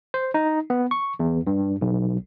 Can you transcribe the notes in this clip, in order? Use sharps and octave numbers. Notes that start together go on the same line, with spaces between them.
C5
D#4
B3
C#6
E2
G2
B1